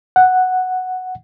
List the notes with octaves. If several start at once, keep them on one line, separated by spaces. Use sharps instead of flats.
F#5